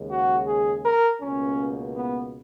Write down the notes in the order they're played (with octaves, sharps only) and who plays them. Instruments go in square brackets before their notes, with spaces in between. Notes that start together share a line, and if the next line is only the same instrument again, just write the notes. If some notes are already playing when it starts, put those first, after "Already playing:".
Already playing: [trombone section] D#2 C#3 G#3
F#4
G#4
A#4
C#2 B2 A#3 C#4
B3